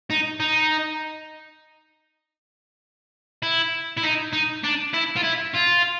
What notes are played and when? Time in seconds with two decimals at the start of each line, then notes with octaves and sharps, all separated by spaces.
0.10 D#4
0.40 D#4
3.43 E4
3.97 E4
4.03 D#4
4.33 D#4
4.64 D4
4.94 E4
5.17 F4
5.24 E4
5.55 F4